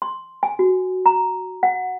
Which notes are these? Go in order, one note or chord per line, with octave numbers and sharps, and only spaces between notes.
C6
G#5
F#4
A#5
F#5